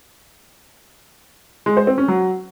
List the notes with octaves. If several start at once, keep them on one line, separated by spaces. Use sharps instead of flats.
G#3
C5
C4
C#4
F#3